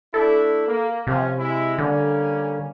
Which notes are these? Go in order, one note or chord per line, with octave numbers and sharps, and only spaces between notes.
A3 D4 E4 A4
A#3
C3 F3 C#4
G#3 E4
D3 G3 A#3 C#4